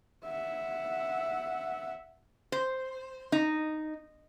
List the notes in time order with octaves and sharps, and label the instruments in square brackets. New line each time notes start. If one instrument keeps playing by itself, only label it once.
[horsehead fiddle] E5 F#5
[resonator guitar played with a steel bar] C5
D#4